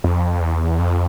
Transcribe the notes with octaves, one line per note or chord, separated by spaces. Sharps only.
F2
E2
F2